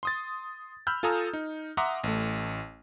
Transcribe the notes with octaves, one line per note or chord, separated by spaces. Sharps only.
C6 D#6 A6
B5 E6 F6 G6
F4 A4 G#5 A#5 D#6 E6
D#4
E5 F#5 A#5 C6 D6 D#6
A1 A3